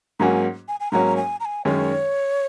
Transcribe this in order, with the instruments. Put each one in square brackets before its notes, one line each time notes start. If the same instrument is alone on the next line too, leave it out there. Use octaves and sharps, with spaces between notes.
[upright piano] G#2 F#3 A#3 C#4 F#4 [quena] G#5 A#5
[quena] G#5
G#5
[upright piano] G#2 F#3 A#3 C#4 F#4 [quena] A#5
[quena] G#5
A#5
G#5
[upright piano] F#2 D#3 G#3 C#4 [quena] C#5